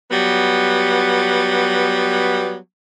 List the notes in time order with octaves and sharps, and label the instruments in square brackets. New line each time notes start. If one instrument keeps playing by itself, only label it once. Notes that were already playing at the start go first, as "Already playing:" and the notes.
[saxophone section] F#3 G3 B3